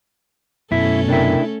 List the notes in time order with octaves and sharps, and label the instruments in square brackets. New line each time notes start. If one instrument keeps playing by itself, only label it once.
[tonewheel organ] F#2 B2 [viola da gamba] A3 C#4 A4 [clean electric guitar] E4
[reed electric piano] C3 A#4 G5 [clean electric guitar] D4 E4